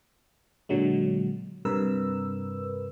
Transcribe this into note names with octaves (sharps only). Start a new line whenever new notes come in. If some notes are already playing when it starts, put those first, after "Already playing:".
A#2 D3 F#3 G#3
G2 C3 A#4 B4 E6